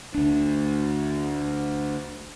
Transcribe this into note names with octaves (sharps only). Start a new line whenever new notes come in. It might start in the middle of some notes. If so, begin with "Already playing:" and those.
D2 D4